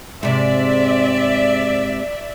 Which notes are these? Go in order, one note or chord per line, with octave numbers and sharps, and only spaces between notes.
G#2 C3 D5 E5